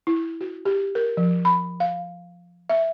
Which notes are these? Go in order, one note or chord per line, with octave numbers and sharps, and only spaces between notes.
E4
F#4
G4
A#4
F3
B5
F5
E5